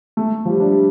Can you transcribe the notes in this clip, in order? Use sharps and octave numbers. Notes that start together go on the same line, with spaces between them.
A3
F3
G3
D4
G3